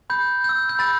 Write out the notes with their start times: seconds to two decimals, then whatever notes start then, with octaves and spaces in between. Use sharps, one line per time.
0.10 B5 G6
0.44 E6 G6
0.69 G6
0.79 B5 A6